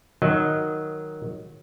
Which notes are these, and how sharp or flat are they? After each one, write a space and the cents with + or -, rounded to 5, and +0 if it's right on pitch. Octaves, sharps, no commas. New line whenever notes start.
D#3 +0 F#3 +0 D#5 +0